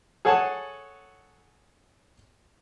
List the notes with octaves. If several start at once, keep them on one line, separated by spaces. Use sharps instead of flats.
G#4 A4 C#5 F#5 G#5 A5